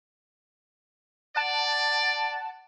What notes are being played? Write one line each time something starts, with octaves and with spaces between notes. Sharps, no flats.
D5 F#5 A5